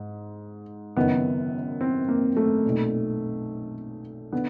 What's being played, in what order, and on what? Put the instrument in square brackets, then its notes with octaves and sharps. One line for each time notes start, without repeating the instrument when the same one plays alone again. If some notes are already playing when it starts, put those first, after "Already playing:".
Already playing: [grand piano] G#2
F#1 F#2 D#3 B3
C4
A#3
A3
B1 A#2
D3 B3